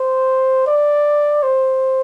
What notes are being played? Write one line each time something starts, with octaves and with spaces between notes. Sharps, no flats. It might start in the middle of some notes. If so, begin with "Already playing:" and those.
Already playing: C5
D5
C5